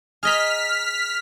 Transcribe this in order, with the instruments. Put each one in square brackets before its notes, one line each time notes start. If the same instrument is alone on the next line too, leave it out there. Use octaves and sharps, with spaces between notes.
[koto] G#4 D#5 A#5 [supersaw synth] F6 B6